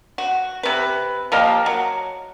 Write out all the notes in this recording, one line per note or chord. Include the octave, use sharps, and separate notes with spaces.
F#4
C3 B4
F3 A#3 G4 D#5
F#3